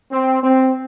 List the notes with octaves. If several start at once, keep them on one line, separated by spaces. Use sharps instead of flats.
C4
C4